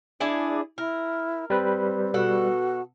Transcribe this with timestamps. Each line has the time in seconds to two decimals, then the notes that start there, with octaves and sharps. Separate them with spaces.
0.20 D4 E4 G#4 D5
0.78 E4 A#4
1.50 G3 C4 B4
2.14 B2 F#4 A4 F#5